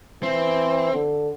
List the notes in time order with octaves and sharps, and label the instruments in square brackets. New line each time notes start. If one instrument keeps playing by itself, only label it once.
[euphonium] E3 [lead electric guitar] C4
[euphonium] D3